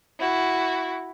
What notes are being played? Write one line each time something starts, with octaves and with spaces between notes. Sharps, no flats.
E4 F#4